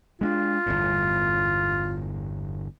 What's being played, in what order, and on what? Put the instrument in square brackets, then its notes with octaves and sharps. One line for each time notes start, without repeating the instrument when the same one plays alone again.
[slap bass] G#3 C#4 D4 [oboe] F4
[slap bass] G1 E2 A2